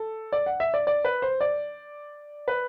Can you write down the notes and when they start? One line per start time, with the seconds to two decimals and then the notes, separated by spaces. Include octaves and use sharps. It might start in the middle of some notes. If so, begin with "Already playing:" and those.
Already playing: A4
0.33 D5
0.46 F#5
0.60 E5
0.74 D5
0.87 D5
1.05 B4
1.22 C5
1.41 D5
2.48 B4